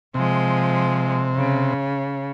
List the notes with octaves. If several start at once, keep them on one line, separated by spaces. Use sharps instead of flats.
C3 F3 G#3
C#3